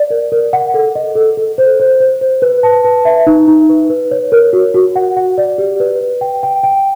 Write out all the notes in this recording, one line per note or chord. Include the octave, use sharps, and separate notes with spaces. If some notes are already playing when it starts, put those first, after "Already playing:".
Already playing: D5
A#4
A#4
F#5
A4
D#5
A4
A4
C5
C5
C5
C5
B4
A5
B4
E5
D#4
D#4
B4
B4
C#5
A#4
F#4
F#4
F#5
F#5
D5
G4
B4
B4
G5
G5
G5